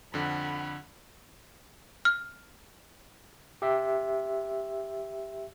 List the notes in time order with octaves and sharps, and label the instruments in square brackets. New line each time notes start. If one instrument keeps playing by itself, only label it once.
[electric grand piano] F2 D3 [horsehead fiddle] F#5 B5
[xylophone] F6
[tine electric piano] G4 E5